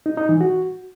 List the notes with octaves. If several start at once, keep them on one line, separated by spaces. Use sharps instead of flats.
D#4
D#4
E3
F#4